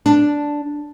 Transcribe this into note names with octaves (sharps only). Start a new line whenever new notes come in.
D4